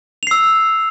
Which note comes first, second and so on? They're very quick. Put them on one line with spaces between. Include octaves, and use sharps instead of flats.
F7 C7 E6